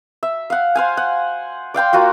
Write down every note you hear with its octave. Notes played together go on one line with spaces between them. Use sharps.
E5
F5 F#5
C5 F5 G#5
F#5
D5 F5 G5 C6
A#3 F4 F#4 F5